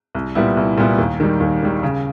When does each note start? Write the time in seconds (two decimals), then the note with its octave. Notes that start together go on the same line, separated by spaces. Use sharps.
0.15 C2
0.35 A#2 G3 B3 E4
0.57 C2
0.78 A#2 G3 B3 E4
0.98 D#2
1.20 D#3 G3
1.40 D#2
1.62 D#3 G3
1.83 C#3